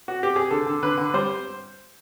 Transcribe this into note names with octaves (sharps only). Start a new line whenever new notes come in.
F#4
G4
G#4
D3 A4
D3
D3 B4
D3
G3 C5